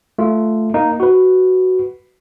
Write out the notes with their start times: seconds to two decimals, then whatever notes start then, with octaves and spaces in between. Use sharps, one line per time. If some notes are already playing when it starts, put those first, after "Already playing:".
0.18 A3 F4
0.74 A#3 D#4
1.00 F#4 B4